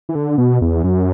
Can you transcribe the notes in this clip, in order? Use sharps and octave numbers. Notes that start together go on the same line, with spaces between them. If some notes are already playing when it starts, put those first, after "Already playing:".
E3
D3
B2
E2
F#2